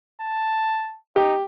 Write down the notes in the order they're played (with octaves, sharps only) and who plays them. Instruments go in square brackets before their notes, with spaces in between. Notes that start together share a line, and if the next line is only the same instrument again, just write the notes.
[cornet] A5
[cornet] D#4 [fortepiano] G4